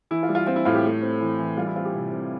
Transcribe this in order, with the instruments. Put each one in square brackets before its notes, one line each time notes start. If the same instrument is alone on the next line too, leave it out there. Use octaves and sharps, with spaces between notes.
[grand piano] E3 E4
F4
G3
F4
C4 F4
E4
A2 F4
G4
A3
C4
E3
E3
G3 F4
E4
C4 F4
G4
C3
C3